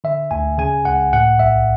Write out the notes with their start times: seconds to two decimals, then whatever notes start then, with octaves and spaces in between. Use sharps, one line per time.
0.04 D3 E5
0.31 D2 G#5
0.58 C#3 G#5
0.85 C#2 F#5
1.12 A2 F#5
1.39 B1 E5